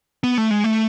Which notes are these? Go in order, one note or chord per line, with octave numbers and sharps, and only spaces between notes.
B3
A3
G#3
A3